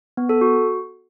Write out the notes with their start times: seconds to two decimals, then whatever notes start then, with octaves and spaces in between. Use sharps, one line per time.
0.17 B3
0.29 A4
0.41 F#4